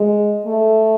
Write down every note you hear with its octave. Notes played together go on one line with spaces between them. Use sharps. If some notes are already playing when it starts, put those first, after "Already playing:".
Already playing: G#3
A3